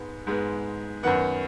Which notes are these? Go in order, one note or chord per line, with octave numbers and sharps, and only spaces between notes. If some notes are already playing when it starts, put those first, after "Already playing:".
Already playing: G#2 G#3 B3
G#2 G#3 B3
F#2 D#3 B3 F#5